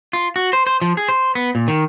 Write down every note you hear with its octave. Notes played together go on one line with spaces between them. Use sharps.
F4
F#4
C5
C5
F3
G#4
C5
B3
A#2
D#3